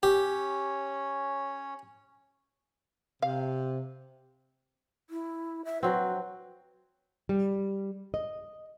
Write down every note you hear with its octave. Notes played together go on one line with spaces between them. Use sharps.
C#4 G4 C#5
C3 F5
E4
E5
F#3 C4 B4
G3
D#5